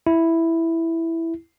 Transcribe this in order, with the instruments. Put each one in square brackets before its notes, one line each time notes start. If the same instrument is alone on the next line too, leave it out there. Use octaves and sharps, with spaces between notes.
[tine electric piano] E4